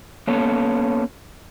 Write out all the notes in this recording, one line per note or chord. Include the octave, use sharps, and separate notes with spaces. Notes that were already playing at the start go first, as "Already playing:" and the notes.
A#3 B3 C#4 A4 C#5